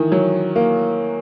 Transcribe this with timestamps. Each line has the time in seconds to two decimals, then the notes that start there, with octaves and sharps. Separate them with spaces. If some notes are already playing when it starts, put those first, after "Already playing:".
Already playing: D#3 E3
0.12 F#3
0.56 A#3